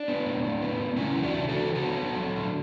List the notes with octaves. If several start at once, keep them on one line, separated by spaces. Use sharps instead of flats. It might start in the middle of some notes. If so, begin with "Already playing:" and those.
Already playing: D4
B3
A2
A2
B3
A2
C#3 C#4 E4
E3
D4 F#4
C#3
E3 F#4 A4
C#3
F#4 A4
B3
F#3
F#3
D3